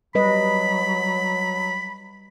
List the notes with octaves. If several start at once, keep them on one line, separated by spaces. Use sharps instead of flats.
F#3 G3 B4 D#5 B5